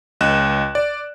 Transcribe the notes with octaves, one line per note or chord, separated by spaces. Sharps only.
C#2 D#5 F#6 E7
D5